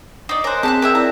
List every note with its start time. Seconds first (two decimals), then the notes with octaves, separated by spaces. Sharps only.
0.29 D#4 D5 C7
0.44 A#4 C5 C#5 G#5 F#6
0.63 C4 G#4 A5 C6 F#6 B6
0.82 G4 G#4 A#4 E5
0.95 E4 D5 G5 A#5